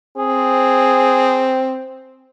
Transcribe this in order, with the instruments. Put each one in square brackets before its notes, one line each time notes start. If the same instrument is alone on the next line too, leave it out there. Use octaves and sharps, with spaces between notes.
[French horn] C4 [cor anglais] G#4